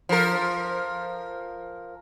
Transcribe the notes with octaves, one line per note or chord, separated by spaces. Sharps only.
F3 A#4